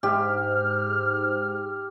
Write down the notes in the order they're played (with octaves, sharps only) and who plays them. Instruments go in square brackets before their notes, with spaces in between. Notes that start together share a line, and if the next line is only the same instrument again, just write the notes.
[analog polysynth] G#2 [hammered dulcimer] G4 [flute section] F6